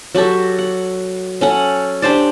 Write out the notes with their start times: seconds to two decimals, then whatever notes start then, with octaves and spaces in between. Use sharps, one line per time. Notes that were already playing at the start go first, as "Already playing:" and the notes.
0.15 F#3 F#4 G4 A4
0.59 F#5
1.41 C#4 A4 F#5
2.02 D4 G4 C5 D5